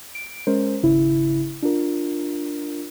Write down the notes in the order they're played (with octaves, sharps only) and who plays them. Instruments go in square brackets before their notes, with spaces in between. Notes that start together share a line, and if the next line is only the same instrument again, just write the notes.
[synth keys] D7
G#3 C#4 A#4 C5
G#1 C#3 E4
D4 F4 A#4